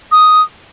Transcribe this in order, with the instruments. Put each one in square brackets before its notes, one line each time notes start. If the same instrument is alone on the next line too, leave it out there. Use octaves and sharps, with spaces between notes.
[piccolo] D#6